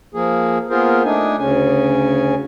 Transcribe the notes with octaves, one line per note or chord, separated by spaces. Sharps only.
F3 A#3 G#4
A#3 B3 F4 G#4 A#4 C5
A3 D4 D#4 G#5
D2 C#3 C#4 G#5